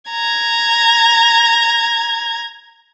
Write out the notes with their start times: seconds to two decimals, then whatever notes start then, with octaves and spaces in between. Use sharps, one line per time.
0.10 A#5 G#6